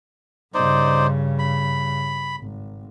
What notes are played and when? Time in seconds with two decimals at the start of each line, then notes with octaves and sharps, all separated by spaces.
0.54 G2 C#3 D#4 C5 D5
1.39 B5
2.38 G#1